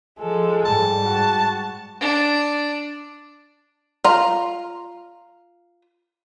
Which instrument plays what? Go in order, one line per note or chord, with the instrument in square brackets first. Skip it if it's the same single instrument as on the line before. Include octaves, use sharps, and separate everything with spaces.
[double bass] F3 [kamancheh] G#3 A4
[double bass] G#2 G3 [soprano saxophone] A5
[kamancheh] F#4
[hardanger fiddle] D4
[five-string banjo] F4 A#5